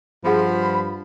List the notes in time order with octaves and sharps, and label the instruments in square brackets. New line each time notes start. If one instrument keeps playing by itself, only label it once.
[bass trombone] G2 [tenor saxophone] F3 [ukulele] F4 G#4 F#5 [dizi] B5